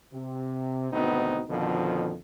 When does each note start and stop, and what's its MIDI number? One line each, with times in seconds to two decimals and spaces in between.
0.12 0.91 48
0.91 1.41 32
0.91 1.41 38
0.91 1.41 47
0.91 1.41 59
0.91 1.41 60
0.91 1.41 63
1.49 2.14 41
1.49 2.14 47
1.49 2.14 50
1.49 2.14 51
1.49 2.14 53